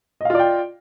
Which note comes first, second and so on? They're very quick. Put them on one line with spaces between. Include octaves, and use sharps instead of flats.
D#5 F5 F4 D5 G5